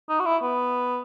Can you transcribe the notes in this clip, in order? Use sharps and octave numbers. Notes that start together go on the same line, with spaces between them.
D#4
F#4
E4
B3